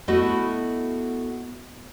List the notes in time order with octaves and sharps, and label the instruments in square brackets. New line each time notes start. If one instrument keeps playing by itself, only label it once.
[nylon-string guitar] A3 B3 E4 F#4 A4 D#5